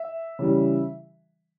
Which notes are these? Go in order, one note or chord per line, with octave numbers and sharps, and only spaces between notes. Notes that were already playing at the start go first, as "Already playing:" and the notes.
Already playing: E5
C#3 E3 G3